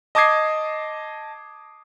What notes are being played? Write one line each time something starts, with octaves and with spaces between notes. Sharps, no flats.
D#5 A5 D6 D#6 G#6 C7